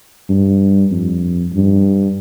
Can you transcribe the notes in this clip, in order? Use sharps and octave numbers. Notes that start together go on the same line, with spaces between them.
G2
F2
G2